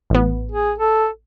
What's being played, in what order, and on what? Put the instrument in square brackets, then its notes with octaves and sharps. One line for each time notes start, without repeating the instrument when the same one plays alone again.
[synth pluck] A1 B3
[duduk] G#4
A4